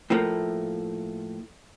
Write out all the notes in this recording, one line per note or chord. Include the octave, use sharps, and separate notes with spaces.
A2 F3 A3 A#3